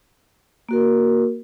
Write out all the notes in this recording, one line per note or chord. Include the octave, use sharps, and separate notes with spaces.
A#3 F#4 A#4